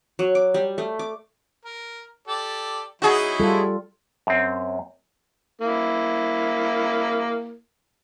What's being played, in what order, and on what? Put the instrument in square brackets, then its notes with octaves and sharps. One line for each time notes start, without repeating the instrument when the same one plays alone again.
[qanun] F#3
D6
G3
A3
D6
[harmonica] A#4
G4 A4 D5
[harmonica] F#3 D#4 E4 [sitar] F#4 G#4
[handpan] G3 F4 A4
[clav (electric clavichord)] F#2 C4
[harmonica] A#3 E4